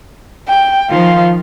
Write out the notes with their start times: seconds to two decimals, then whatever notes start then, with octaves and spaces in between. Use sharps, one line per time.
0.49 G5
0.90 D#3 F3 F4